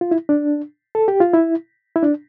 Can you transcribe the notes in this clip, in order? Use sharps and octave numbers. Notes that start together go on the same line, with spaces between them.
F4
E4
D4
A4
G4
F4
E4
E4
D4